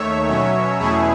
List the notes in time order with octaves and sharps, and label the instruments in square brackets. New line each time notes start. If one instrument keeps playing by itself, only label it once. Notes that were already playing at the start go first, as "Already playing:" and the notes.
Already playing: [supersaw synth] D#2 D#3 A3 C#5 E5
B2 F#3 C#4
E2 B2 A3 C#4 E4 G#4